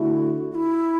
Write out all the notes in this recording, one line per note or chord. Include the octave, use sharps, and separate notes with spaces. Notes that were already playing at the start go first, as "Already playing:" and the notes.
Already playing: D3 A3 E4 F#4
F#4
E4